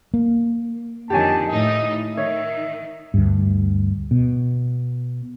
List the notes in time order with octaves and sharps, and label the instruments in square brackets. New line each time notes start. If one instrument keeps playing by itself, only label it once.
[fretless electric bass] A#3
[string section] F2 D3 D#3 [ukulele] G4 C#5 G#5 [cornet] A5
[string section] A2 D#4 [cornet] D#5
[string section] D#3 [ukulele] C#5 [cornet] E5
[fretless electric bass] D2 G2
B2